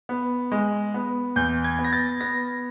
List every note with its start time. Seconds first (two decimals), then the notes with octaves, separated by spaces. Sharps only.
0.09 B3
0.52 G#3
0.94 B3
1.36 E2 G6
1.64 G#6
1.79 B3
1.84 A#6
1.93 A6
2.21 B3 A#6